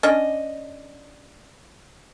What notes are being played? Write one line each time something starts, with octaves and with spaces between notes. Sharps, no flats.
C#4 D4 D#5